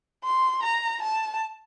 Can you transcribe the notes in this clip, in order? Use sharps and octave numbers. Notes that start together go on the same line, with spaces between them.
C6
A#5
A5